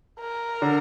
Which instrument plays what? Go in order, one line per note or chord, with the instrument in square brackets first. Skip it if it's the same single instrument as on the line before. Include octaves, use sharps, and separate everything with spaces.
[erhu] A#4
[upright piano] D3